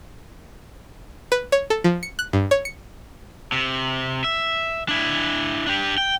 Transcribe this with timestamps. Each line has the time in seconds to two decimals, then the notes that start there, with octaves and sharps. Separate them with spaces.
1.32 B4
1.52 C#5
1.70 A4
1.84 F3
2.03 C#7
2.19 F#6
2.33 G2
2.51 C#5
2.65 C#7
3.52 C3
4.24 E5
4.89 D4 E4
5.67 D4 G4
5.98 G5